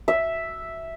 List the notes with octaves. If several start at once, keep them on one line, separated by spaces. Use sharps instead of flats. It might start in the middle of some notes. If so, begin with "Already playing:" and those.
E5